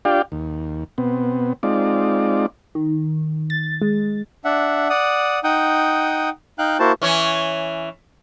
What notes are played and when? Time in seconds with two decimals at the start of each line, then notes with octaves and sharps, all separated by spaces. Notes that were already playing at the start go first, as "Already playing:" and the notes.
0.05 D4 F4 G4 D5 F5 G5
0.32 D#2
0.98 B2 B3 C4
1.63 G#3 C4 D#4 F4 D5
2.75 D#3
3.50 A6
3.82 G#3
4.45 D4 E5 F#5
4.90 D5 F#5 D#6
5.44 D#4 F#5 G5 D#6
6.59 D#4 F5 G5 F#6
6.79 A#3 E4 F#4 C5 A5
7.02 E3 C#4